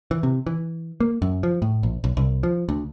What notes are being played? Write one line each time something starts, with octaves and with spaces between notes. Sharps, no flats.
E3
C3
E3
A#3
F#2
F3
A2
A#1
B1
C2
F3
D2